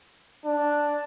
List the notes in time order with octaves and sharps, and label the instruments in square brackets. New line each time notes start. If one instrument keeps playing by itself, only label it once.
[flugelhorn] D4